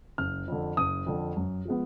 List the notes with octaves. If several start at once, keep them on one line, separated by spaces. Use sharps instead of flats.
F#1 F6
F2 D3
F#1 D#6
F2 D3
F#2
F3 G#3 B3